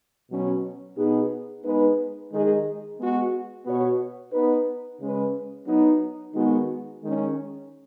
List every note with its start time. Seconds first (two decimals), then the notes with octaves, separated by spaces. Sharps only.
0.29 B2 F#3 C#4
0.97 B2 B3 D#4 G#4
1.64 G#3 B3 D#4 B4
2.31 D#3 G#3 D#4 G#4 D#5
2.98 G#3 B3 F#4
3.66 B2 B3 F#4 C#5
4.33 B3 D#4 B4
5.00 C#3 G#3 C#4 B4
5.67 F#3 B3 D#4
6.34 D#3 G#3 B3 D#4 F#4
7.02 D#3 G#3 C#4